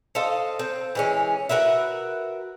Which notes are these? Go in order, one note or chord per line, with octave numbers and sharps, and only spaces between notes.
A4 C5 D#5 F5
C4
E3 G#3 C#4
F#4 A#4 B4 E5